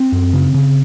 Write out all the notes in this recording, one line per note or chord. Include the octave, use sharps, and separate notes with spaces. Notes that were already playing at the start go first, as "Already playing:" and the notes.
Already playing: C4
F#2
C#3
C#3